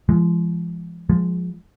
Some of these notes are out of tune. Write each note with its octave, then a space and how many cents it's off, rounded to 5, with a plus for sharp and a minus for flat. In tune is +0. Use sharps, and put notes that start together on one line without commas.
F3 -40 G#3 +0
F3 +20 G#3 +0